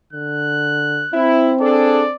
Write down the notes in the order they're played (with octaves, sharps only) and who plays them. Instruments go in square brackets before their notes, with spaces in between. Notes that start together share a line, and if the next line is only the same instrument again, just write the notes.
[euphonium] D3 [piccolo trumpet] F#6
[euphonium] C4 [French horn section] E4
[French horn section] D4 G#4 A4 [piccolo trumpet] D5